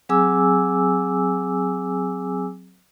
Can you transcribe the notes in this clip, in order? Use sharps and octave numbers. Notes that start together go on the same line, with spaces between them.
F#3 C4 G#4 G#5 D6 E6